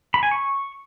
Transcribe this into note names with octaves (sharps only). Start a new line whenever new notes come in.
B5
G#5
C#6